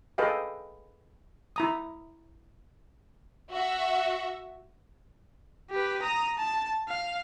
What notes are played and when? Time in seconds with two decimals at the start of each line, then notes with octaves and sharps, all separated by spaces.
0.18 G#4 A4 B4 D#5 F5 G5
1.56 E4 A#5 D#6
3.52 F#4 E5
5.71 G4 B4
6.02 A#5 D#6
6.38 A5
6.88 F5